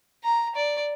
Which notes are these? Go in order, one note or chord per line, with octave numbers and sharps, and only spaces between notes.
A#5
D5